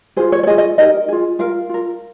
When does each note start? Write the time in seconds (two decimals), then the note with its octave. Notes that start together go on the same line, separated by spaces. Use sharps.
0.17 F4 G#4 C5
0.32 C#5
0.43 C#5
0.47 F4 G#4 D#5
0.58 D#5
0.78 D#4 G4 A#4 D#5
1.08 F4 G#4
1.39 F4 A#4 F5
1.69 F4 A#4